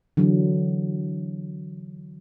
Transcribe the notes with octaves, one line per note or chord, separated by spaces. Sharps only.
D3 E3 F#3